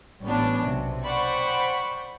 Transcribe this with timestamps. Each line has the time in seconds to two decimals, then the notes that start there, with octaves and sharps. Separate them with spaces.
0.23 A1 G3 B3 C#4 D4
0.66 B1 C3
1.05 C5 D5 F#5 G5 B5 C#6